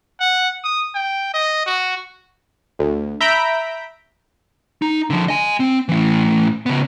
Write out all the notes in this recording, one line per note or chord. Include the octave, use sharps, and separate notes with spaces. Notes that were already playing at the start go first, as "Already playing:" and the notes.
F#5
D#6
G5
D#5
F#4
D2
E5 A#5 B5 G6 B6 D7
D#4
D3 F3
D#5 G#5
C4
A2 E3
C#3 B3